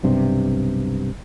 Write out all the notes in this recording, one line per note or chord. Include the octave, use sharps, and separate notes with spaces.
B1 G2 C3